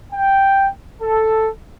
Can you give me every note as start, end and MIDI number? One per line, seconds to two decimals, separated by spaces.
0.13 0.69 79
1.02 1.49 69